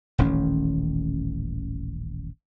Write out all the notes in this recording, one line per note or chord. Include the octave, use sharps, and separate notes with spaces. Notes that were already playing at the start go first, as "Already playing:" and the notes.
D#1 A1 D#3 C#4